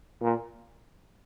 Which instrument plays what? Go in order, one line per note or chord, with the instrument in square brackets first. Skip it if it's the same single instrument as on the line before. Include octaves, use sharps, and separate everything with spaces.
[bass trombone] A#2